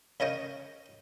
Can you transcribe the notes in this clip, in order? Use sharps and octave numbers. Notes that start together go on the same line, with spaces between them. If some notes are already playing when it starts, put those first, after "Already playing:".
C#3 A#4 C#5 D#5 G5